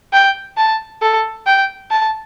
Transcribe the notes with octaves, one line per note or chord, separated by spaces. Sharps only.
G5
A5
A4
G5
A5